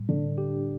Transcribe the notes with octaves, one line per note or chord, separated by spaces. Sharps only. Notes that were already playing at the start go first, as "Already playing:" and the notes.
Already playing: A2 G3
D3 D4
G4